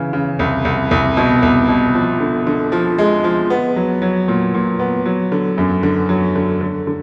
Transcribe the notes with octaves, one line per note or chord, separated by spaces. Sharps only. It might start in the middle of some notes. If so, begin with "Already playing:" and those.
Already playing: C#3 E3
C#3
C2
C2
C2
B2
C2
B2
F3
D3
D3
F3
G#3
F3
B3
F#3
F#3
A#2
A#2
B3
F#3
D3
F#2
D3
F#3
D3
D3
D3